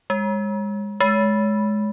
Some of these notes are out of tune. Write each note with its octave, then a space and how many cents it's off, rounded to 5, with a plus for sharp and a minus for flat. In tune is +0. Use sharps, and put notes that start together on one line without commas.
G#3 -25
G#3 +20